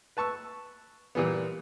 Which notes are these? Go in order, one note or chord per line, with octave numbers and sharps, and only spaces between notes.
B4 A5 C#6 E6
A#2 E3 G3 B3